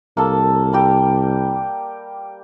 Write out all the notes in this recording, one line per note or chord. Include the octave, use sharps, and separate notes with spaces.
C2 A#3 A4
G3 A#3 G4